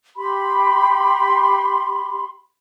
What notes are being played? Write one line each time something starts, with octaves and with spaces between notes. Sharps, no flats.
G4 B5 C6